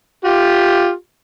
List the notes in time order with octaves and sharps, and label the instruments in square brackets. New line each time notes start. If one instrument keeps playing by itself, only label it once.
[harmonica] F4 G4